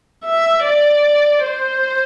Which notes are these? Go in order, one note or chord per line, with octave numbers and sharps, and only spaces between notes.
E5
D5
C5